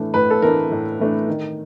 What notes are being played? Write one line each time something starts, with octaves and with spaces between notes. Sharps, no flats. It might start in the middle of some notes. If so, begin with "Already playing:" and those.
Already playing: A2 E3 A3 D4
A2 B4
A4
E3 A3 D4 A#4
A2
E3 A3 D4
D#3